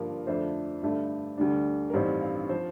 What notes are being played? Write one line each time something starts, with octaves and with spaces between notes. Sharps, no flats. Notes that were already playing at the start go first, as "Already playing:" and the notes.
Already playing: G2 D3 F3 A#3 D4 A#4
F2 D3 A3 D4 C5
G2 D3 A3 D4
D2 D3 G3 D4
A#4
A1 G2 D#3 G3 C4 C5
F5
F3 C5